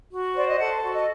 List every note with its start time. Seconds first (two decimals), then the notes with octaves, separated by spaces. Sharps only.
0.11 F#4
0.35 C5 D5
0.48 D#5
0.59 A4 F#5
0.83 F#4
0.94 D#5